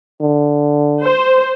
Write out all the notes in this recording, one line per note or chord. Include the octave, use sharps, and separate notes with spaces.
D3
C5